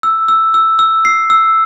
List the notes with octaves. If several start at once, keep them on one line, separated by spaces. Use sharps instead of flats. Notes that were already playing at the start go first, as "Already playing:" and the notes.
E6
E6
E6
E6
C7
E6